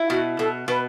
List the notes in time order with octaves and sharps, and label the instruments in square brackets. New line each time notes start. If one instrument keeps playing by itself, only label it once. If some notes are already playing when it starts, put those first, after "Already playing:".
Already playing: [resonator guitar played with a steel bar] E4
[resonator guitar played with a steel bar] B2 [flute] F#4
[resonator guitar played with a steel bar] B2 [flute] A4
[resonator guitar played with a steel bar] B2 [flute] B4